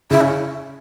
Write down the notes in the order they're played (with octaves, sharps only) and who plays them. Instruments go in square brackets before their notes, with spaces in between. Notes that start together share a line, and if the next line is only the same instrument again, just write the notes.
[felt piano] C#3 [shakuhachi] E4
[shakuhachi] C#4